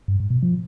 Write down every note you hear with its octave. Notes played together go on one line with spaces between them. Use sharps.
G2
G#2
B2
F3